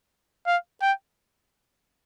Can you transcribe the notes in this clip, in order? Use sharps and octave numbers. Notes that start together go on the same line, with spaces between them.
F5
G5